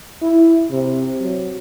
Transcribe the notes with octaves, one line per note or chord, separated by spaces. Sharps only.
E4
C3
F#3